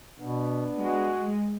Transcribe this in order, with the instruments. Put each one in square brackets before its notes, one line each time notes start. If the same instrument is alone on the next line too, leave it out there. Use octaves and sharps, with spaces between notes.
[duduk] B2 [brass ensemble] B3 D4
[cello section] G#3 [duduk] F#4